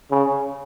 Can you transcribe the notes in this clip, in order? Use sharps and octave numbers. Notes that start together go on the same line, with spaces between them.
C#3